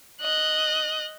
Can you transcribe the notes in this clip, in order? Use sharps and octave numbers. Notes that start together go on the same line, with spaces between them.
D#5 F#6